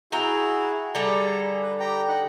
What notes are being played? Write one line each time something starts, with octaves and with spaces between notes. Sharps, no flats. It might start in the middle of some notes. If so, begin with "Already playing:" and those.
E4 F#4 G#4 G5 A#5
D3 G3 G#4 A4 A#5
B4
G4 G5 A#5
D#4 F#5